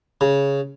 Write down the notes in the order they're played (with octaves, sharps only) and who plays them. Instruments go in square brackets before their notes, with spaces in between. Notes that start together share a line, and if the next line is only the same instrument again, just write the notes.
[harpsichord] C#3